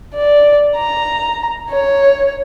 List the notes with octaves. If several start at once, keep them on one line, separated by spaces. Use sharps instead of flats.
D5
A#5
C#5